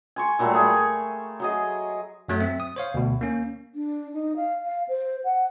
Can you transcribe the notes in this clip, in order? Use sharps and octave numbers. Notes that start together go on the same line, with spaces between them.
G#5 C6 C#6
A#2 F#3 G3 A3
A3 G#4 C#6
F#3 G#4 D#5
F#2 F#3 A3
C4 E5
D#6
C5 C#5 F5
D2 B2
A#3 C#4
D4
D#4
F5
F5
C5
F#5